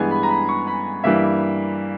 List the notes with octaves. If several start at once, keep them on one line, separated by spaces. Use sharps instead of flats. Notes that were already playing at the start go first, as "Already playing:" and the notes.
Already playing: G2 E3 G#3 B3 G#5
B5
A#5
B5
C#6
B5
G2 E3 G3 A#3 E5